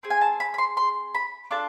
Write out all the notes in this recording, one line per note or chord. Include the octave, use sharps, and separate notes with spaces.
C4 G#4
G#5
A5
B5
B5
C6
C6
B5
D4 F4 A4 A5